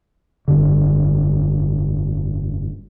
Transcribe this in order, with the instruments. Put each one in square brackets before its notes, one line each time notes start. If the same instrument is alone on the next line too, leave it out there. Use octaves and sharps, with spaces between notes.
[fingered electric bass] F1 G2 D3